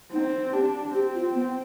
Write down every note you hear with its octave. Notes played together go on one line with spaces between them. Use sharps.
C4 D#4
D4 G4
C4 G4
F4
B3